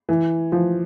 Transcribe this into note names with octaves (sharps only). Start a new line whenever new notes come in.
E3
F3